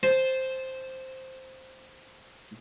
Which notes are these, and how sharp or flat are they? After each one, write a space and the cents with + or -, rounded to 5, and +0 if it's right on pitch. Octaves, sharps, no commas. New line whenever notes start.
C5 +0 A5 -20